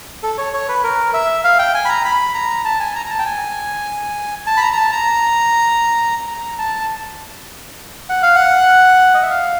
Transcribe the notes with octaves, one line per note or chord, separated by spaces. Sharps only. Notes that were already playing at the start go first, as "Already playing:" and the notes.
A4
C#5
C#5
B4
A#4
E5
F5
G5
G#5
B5
A#5
B5
A#5
A5
G#5
A#5
A#5
A5
G5
G#5
A5
B5
A#5
A#5
A5
A#5
A#5
A5
F#5
F5
F#5
D#5
E5
F5